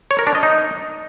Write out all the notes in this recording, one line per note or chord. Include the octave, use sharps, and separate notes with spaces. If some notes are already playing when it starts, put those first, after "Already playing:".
C#5
A#4
D4
D#5
D#4